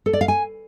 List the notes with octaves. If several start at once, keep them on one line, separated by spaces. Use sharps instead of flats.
A4
D5
F5
G#5